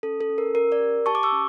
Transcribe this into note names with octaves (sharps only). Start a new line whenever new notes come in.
C#4 A4
A4
C#4
A#4
C#4 A#4
A#4 D5
G4
G4 A5 C#6
D6
C#6 E6
C#4